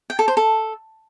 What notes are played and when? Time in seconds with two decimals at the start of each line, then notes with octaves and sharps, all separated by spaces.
0.10 G5
0.19 A4
0.28 C5
0.37 A4